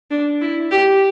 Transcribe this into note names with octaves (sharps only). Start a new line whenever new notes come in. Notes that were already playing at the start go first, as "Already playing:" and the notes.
D4
E4
G4